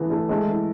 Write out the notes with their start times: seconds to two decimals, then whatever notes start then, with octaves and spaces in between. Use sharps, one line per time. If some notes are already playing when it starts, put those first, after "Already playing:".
Already playing: E3 A3 B3
0.10 A3
0.29 G#3 A3
0.48 E3